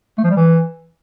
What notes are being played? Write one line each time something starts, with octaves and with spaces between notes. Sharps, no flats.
A3
F3
G3
E3